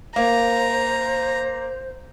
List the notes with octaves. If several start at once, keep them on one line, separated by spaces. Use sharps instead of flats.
A#3 C5 A#5